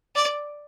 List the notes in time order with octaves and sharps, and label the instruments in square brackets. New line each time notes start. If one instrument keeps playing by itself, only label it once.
[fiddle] D5